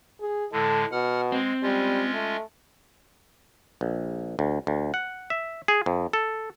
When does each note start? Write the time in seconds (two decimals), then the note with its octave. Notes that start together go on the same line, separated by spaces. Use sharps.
0.21 G#4
0.52 A2 D3 G#3 A4
0.92 B2 F#5 F6
1.32 G#3 C4
1.63 G3 G#3 C#4 F4
2.13 A3
3.81 A#1
4.39 D2
4.67 D2
4.94 F#5
5.30 E5
5.68 G#4
5.86 F2
6.13 A4